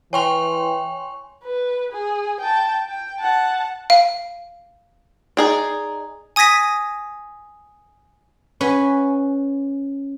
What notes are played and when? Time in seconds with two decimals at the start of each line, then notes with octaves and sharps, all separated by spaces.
0.13 E3 C#5 G5 G#5 C6 C#6 F7
1.44 B4
1.92 G#4
2.40 G5 A5
2.88 G5
3.19 F#5 A5
3.90 F5
5.37 D#4 G#4 D5
6.36 G#5 D#6 G#6 A#6 B6 D#7
8.61 C#4 B4 F#5 G#5